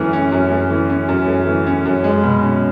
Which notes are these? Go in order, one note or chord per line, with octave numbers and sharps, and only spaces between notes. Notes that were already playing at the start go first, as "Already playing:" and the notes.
Already playing: F#2 E3 A3 C#4
C#4
F#2
A3
E3
C#4
F#2
A3
E3
C#4
F#2
G#3
B2
C#4